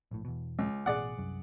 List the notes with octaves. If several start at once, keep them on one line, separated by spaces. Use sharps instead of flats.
A#1 A2
E2 B2
C#2
A1 B2 G#4 D5 F#5
C2 F#2